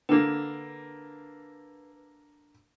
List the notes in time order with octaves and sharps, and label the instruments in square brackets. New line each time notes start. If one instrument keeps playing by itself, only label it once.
[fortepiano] D3 A#3 [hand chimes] B4